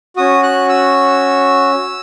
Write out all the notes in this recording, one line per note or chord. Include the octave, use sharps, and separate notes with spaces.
C#4 F#4 D#6
F#6
E6